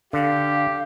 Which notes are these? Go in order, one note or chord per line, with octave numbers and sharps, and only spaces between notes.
D3 G4 F5